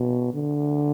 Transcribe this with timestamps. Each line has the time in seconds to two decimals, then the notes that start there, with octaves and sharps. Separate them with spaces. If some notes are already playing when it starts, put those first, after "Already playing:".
Already playing: B2
0.34 D3